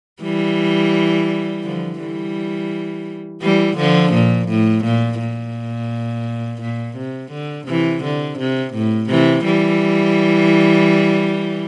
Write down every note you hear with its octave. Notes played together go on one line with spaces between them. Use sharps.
E3 G3
D3 F3
E3 G3
E3 G3
D3 F3
A#2
A2
A#2
A#2
A#2
C3
D3
C3 E3
D3
C3
A2
C3 E3
E3 G3